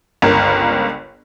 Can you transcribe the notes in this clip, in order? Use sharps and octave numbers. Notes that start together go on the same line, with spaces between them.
G1 C#2 A#4